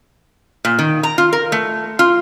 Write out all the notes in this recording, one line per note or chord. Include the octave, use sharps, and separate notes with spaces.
A#2
D#3
A#5
F4
A#4
A3
F4